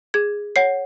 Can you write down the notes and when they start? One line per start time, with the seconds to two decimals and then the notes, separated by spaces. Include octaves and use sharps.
0.14 G#4 G#6
0.56 C#5 F#5 C7